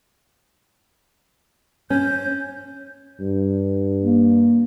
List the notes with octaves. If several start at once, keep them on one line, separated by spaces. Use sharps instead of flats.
C#4 G6
G2
A#3